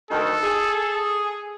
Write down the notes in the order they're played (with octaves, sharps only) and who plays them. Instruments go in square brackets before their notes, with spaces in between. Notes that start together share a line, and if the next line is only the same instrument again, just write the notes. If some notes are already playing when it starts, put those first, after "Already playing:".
[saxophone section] D2 D#3 [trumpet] A4
[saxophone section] G#4